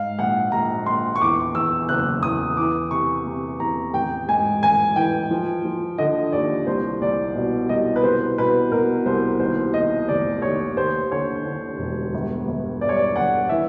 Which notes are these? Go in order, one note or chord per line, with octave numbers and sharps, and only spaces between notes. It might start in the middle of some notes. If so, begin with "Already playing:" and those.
Already playing: G#2 F5
A#1 F#5
A#1 A#5
A#1 C6
C#6
E2 D6
E2 E6
F#1 F#6
E2 D#6
E3 D6
C3 C#6
C3
E2 A#5
A1 G5
G#2 G#5
A1 G#5
E3 G5
F3
F3
D3 D#5
D#2 D5
C2 C5
C2 D5
B2
C2 D#5
B4
C2 C5
B2 B4
B2 A#4
C2 C5
D#2 C5
D#2 D#5
F1 D5
D#2 C#5
D#2 C5
D3 C#5
D3
E1
G1
G1
G2 D5
C#5
D5
G1 F#5
E3 E5